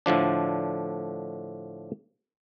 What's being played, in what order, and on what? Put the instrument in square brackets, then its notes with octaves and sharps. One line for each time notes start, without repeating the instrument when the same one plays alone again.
[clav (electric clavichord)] A2 D3 F3 D4